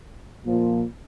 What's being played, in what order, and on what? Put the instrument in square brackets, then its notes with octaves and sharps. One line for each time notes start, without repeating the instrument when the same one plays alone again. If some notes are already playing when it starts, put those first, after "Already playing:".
[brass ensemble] A#2 F3